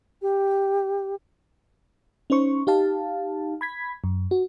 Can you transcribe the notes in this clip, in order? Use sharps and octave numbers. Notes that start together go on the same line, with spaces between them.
G4
C#4 D#4 C5 C#6
D#4 G4 F5 A5
B5 G#6 B6
F#2
F#4